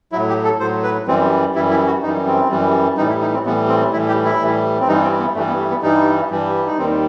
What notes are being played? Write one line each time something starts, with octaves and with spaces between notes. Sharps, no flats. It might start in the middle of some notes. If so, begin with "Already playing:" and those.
A2 F#3 E4
G4
A4
A2 F#3 C5
B4
F#2 E3 G3 C4
F#2 E3 G3 E4
E4
F#4
F#2 E3 G3 D#4
C4
F#2 E3 G3
A2 E3 G3 D#4
E4
D#4
C4
A2 E3 G3 B3
C4
A2 E3 G3 E4
G4
E4
A2 E3 G3
C4
G2 E3 G3 D#4
C4
B3
G2 E3 G3 A3
B3
A3
B3
G2 E3 G3 D#4
G2 E3 G3
D#4
D#2 D#3 G3 C4